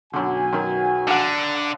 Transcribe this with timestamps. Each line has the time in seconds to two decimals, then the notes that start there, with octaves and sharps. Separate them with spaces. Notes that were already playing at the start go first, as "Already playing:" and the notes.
0.13 B1 F#2 D3 F#4 G#5
0.53 F#2 D#3
1.07 A#1 D3 F#5